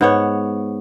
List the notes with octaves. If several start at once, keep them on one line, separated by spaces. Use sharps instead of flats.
G#2 B3 C#5